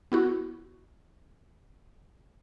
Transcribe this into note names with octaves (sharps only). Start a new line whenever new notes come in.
B3 E4 F#4